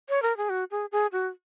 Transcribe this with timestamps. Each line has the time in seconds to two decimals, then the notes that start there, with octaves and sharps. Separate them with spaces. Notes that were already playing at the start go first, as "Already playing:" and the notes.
0.09 C#5
0.22 A#4
0.37 G#4
0.49 F#4
0.71 G#4
0.92 G#4
1.12 F#4